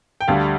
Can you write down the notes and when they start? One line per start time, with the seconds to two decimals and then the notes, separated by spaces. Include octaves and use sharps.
0.21 G5
0.28 D2 D3 G3 F5